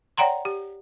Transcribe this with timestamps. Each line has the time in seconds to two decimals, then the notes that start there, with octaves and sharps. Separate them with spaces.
0.18 C#5 D5 F#5 G5 A#5 C6
0.45 G4